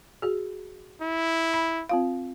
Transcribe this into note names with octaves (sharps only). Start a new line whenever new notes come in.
F#4 G#4
E4
B5
C4 F4 F5